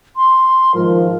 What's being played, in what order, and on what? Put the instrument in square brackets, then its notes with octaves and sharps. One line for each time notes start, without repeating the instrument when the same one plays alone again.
[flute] C6
[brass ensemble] G#2 D#3 F3 [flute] A#4